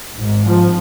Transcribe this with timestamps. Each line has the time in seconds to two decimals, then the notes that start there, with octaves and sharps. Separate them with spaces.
0.16 G#1 G#2
0.45 F3